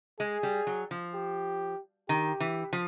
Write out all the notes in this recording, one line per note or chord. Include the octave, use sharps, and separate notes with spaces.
G#3 G#4
G3
F#3
F3
G4
D#3 G4
E3
F3